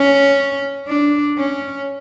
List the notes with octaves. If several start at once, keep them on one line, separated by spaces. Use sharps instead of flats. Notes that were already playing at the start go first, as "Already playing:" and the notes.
Already playing: C#4
D4
C#4